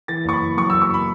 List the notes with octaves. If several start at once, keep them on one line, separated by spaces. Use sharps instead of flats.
E3 A6
F#1 C#6
B5
E3
F#2 C#6
E6
F#1
C#6
B5